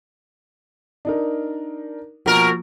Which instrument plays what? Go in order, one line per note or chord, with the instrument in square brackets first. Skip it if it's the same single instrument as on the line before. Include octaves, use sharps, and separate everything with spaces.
[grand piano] D4 D#4 A#4
[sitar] B2 A#4 [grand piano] F3 A#3 F#4